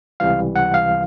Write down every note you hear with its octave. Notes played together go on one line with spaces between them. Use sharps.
C#2 C3 E3 G3 F5
F#5
F5